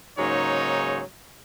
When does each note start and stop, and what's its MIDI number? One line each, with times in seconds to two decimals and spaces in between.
0.18 1.02 44
0.18 1.02 49
0.18 1.02 54
0.18 1.02 58
0.18 1.02 63
0.18 1.02 73